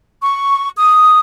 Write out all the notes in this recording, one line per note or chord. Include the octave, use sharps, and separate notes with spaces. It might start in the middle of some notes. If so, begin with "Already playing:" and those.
C#6
D#6